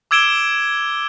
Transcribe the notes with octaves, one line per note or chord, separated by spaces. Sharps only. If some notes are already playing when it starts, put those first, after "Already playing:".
D6 E6 G#6 D7 E7 G7